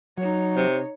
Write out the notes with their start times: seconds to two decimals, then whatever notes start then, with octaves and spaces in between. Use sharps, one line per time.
0.18 F#3 D#4 C#5
0.56 C3